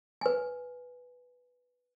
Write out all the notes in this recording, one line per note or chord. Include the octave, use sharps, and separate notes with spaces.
B4 G#5